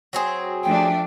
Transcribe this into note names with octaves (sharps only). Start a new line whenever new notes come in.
F#3 C4 G#4
F3 A3 D4 G5